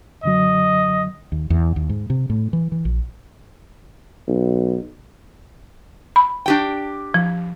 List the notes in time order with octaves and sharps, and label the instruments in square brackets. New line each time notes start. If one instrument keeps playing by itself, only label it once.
[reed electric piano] F#2 D3 F#3 [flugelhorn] D#5
[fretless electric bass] D#2
E2
D#2
G#2
C3
A2
E3
E3
A#1
[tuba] B1
[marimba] B5
[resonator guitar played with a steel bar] D4 G4 G5
[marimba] F3